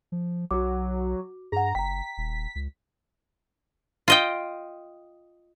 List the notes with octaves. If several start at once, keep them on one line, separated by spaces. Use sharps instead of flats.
F3
B1 F#3 F#4 D6
G2 G#4 F#5 A#5
F#1 G5 A#5 B6
D#1
C#2
F4 D#5 G5